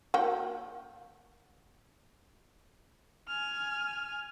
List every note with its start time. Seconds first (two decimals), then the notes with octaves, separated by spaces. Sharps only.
0.14 A#3 F#4 G5
3.28 G#5 F6